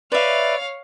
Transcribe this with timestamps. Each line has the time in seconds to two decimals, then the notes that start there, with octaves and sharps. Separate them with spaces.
0.12 B4 C#5 D5 E5 F5